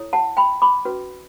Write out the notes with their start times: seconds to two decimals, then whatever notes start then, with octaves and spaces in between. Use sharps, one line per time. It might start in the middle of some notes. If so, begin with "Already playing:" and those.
Already playing: E4 A4 C#5
0.13 F#5 A5
0.37 G5 B5
0.62 B5 D6
0.85 C#4 F#4 B4